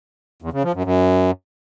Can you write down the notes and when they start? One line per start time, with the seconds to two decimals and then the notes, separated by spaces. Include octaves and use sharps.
0.42 E2
0.53 C#3
0.63 F3
0.74 F#2
0.84 F#2